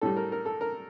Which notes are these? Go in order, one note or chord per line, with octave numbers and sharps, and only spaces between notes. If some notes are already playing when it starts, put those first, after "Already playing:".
A2 G3 A4
A#4
A#4
A4
A#4